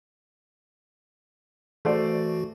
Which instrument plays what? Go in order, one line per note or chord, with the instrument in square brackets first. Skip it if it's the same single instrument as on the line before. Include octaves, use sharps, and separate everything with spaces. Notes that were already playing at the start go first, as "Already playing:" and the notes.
[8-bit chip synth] E3 F#4 [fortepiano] A3 C5 D5